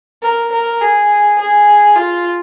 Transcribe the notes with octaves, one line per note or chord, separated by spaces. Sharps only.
A#4
A#4
G#4
G#4
F4